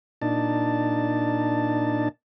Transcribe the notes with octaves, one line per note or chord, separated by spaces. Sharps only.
A#2 D4 D#4 A5